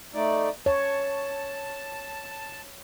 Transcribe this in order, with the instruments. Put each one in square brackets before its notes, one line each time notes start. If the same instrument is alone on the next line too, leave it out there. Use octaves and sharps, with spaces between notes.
[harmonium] A3 D#4 D5
[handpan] C#5 [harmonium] A5